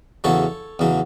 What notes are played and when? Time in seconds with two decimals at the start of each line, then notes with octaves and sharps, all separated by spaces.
0.24 E2 C#3 F#3 A4 C#5
0.79 E2 C#3 F#3